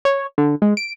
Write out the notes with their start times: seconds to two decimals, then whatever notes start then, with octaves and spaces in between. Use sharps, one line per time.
0.05 C#5
0.38 D3
0.62 G#3
0.77 D7